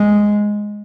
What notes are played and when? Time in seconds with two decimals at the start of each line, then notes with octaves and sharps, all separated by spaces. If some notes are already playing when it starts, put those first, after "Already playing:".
Already playing: G#3